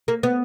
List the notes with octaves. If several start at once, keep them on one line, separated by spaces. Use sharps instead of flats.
A#3
B3